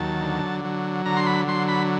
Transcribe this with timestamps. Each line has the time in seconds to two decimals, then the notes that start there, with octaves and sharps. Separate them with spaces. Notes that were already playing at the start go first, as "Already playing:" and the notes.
Already playing: D#2 F#3 A5
0.22 D3
0.65 F#3
1.06 D3 A#5
1.17 C6
1.26 B5
1.48 F#3 C6
1.68 B5